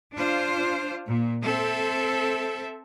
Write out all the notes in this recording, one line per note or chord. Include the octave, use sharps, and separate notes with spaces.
D4 F4 C5
A#2
C4 A4 E5